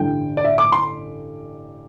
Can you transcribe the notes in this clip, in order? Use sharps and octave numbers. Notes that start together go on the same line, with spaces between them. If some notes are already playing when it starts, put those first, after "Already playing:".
Already playing: A1 G2 D3 G3 G5
D5
E5
D6
C6